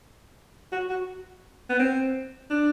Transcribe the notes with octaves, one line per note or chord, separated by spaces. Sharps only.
F#4
F#4
B3
C4
D4